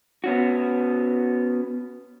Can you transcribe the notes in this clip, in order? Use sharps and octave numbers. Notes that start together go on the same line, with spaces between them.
B3 C#4 F#4